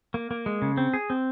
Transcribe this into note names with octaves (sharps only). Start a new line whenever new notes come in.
A#3
A#3
G#3
C#3
C4
G#4
C4